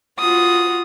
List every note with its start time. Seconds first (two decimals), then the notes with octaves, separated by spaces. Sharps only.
0.18 F4 F#4 D#6